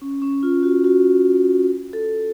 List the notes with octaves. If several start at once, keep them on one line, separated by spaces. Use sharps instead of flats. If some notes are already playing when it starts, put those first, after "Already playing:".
C#4
C#4
F4
F#4
F#4
A4